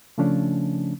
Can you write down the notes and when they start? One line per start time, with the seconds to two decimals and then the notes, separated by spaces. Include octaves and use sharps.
0.18 C#3 F3 A3 C#4 D4